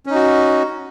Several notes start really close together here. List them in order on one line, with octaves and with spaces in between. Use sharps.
C#4 D#4 F#4